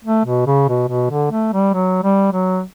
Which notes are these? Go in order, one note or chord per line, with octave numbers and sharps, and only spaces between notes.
A3
B2
C#3
B2
B2
D3
A3
G3
F#3
G3
F#3